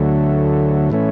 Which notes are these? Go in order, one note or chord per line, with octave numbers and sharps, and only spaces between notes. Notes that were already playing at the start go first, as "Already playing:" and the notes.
Already playing: D2 D3 F#3 A3
A2 E3 A3 C#4